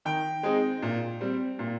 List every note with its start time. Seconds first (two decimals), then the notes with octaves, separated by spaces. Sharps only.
0.05 D#3 G5
0.43 G#3 C4 D#4
0.82 A#2
1.21 G3 C4
1.59 A#2